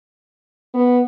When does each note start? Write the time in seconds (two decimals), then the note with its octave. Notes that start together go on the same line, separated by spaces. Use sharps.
0.74 B3